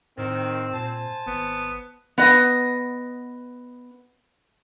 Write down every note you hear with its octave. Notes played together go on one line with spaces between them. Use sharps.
A2 D#3 C4
A#2 C5 G#5 A5
G#1 B3
B3 D#5